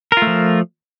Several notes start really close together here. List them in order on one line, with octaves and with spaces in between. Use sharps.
A#4 F4 A3 F3